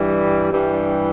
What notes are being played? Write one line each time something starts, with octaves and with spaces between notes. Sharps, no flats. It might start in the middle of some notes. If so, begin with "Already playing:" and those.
Already playing: G2 E3 G3
G2 E3 G3